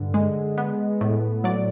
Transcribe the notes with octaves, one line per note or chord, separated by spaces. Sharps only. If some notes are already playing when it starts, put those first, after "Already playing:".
Already playing: G2 D3
G#3
B3
A2
F#3 D5